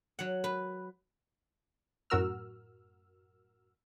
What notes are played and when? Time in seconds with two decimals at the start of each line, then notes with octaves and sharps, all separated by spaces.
0.19 F#3 F#5
0.44 B4
2.10 F#2 A2 F#4 A#4 E6 F6